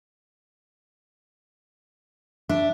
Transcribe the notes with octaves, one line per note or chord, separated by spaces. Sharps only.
D4 E5